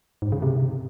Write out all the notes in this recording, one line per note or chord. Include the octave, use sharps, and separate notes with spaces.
G#2
C#3
C3